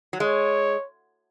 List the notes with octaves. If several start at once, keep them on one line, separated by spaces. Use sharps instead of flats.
F#3
G#3 C#5